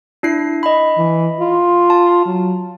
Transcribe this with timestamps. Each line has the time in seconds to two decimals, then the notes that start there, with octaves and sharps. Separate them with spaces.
0.23 D4 E4 C7
0.63 D#5 B5
0.98 E3
1.41 F4
1.90 A5
2.26 F#3